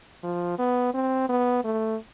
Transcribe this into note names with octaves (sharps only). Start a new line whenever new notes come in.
F3
B3
C4
B3
A3